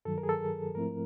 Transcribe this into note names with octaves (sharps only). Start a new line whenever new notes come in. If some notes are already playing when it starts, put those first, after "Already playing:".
G2 D#3 F#3 A4
A#4
G#4
A4
G#2 F3 A3 C4 E4 A#4